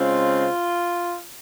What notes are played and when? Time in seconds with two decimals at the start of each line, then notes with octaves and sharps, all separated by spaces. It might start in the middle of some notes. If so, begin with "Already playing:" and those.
Already playing: C#3 G#3 C4 F4